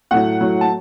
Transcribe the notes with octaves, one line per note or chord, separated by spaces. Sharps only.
A2 F#3 A3 F#5
A2 F#3 A3
A5